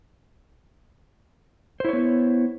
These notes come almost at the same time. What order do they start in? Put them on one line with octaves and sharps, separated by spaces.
C5 E4 C#5 B3